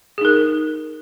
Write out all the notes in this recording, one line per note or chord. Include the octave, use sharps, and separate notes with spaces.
D#4 G#4 A#4